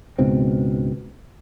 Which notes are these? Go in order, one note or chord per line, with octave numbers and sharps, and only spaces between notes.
C#2 G#2 B2 C4